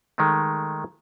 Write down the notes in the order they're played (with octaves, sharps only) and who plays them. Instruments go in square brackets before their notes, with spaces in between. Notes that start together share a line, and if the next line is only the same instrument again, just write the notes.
[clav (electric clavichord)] D#3 G#3 A3